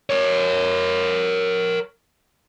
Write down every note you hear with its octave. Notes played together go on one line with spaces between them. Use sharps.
A#4 C#5